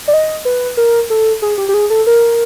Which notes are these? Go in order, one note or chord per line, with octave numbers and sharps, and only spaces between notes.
D5
D#5
B4
A#4
A4
G#4
G4
G4
G#4
A4
A#4